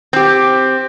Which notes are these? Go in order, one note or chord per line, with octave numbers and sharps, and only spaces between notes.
C4 G4